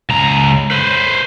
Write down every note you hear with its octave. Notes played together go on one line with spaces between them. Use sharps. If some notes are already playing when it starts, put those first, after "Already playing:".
C#2 A#5
B4 C5